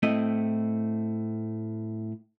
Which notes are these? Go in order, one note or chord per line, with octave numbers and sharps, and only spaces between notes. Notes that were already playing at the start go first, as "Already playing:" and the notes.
A2 A3 C4 E4 D#5